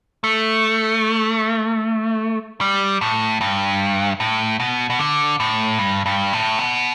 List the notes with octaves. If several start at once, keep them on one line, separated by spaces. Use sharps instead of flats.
A3
G3
A2
G2
A2
B2
B2
D3
A2
G2
G2
A2
B2